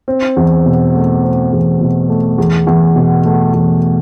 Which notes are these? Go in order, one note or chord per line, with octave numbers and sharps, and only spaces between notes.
C4
E2
B2
A3
C4
E2
B2
A3
E2
E2
B2
A3
E2